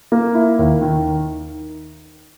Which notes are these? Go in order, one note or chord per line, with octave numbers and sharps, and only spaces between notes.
A#3
E4
D#2
D#3